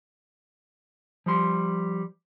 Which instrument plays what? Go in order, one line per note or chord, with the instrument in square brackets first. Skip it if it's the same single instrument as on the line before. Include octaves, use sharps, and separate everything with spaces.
[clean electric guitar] F3 G3 C6